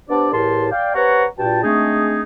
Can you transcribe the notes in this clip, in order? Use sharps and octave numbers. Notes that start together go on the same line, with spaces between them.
B3 D4 G4 C5 D5
E2 A2 G4 A#4 A5 C6
D5 F5 G5
C3 B4 C#5 F#5 A#5 C#6
G2 A#2 F#4 G5 A5
G#3 A3 C4 D4 D#4 G#4